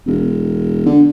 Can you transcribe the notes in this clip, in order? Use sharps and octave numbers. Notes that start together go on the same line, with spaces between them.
E1
D3